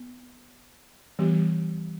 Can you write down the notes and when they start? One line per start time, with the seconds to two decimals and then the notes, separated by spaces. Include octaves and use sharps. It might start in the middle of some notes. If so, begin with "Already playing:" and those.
Already playing: B3
1.19 E3 G3 B3 G4